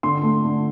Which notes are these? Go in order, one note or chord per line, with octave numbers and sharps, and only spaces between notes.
D3 C6
A3
D3